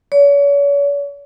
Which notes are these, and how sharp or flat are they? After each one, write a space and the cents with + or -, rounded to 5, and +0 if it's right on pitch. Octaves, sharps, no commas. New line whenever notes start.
C#5 +40